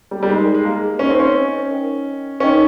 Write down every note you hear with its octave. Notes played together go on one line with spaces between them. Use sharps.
G3
G3
G#3 D#4 A#4 D#5
G#3
A#3
C#4 D#4 A#4 D#5
C4
C#4
D#4 A#4 D#5 G5 C#6
C#4 D#4 A#4 D#5 G5 C#6